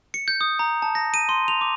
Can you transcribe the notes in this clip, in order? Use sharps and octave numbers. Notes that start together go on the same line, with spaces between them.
C#7
G6
D#6
A#5
A5
A#6
D#7
C6
F7
D6